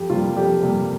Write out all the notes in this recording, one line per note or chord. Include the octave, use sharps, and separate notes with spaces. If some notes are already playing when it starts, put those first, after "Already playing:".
Already playing: F2 G4
C3 G3 A#3 F4
F2 G4
C3 G3 A#3